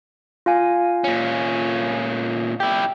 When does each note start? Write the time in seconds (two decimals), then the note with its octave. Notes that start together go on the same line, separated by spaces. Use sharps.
0.46 F4 F5 G#5
1.04 A#2 C#4
2.60 E4 G4 G5